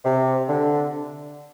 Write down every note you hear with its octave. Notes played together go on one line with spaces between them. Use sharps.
C3
D3